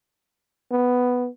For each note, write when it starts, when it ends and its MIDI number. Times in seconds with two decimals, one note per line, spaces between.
0.71 1.28 59